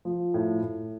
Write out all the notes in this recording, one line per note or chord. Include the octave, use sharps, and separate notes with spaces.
F3
A2
A2